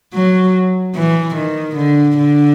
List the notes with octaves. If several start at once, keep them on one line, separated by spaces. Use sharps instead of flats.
F#3
E3
D#3
D3
D3